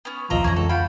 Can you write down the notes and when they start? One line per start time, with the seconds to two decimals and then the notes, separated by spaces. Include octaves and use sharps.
0.05 B3 C#4
0.30 D1 B1 E2 F3 D#5 E5 A#5
0.44 F2 E3 C#4 E4 A#5
0.56 C#2 A4
0.69 F4 F#5 G5 B5